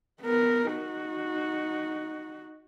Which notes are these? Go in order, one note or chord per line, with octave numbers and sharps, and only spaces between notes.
B3 A#4
D#4 F#4